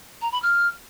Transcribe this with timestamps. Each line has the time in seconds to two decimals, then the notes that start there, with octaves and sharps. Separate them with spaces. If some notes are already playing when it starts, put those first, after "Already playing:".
0.22 A#5
0.32 B5
0.43 F6